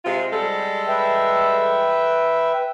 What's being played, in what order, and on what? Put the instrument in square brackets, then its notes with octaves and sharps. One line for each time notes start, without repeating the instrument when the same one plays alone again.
[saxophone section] C3 G#3 F4
G3 G#3 A4
[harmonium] B4 E5 G5